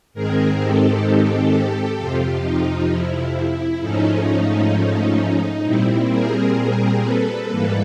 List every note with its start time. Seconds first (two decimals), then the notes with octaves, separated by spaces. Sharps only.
0.14 G#2 D#3 G#3 C4 G#4 A#4
0.59 G4 A4
1.97 F2 C3 F3 F4 G4
2.43 D#4 F4
2.89 E4
3.81 G#2 F3 A3 C#4 D#4
5.64 A#2 G3 C4 E4
6.09 G#4 A#4
7.01 A4 B4
7.47 G#2 E3 G3 A#3